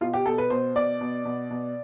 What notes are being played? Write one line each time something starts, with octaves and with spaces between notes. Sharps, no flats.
B2 F4
G4
B2 A4
B4
B2 C5
B2 D5
B2
B2
B2